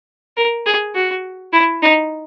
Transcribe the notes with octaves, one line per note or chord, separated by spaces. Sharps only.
A#4
G#4
F#4
E4
D#4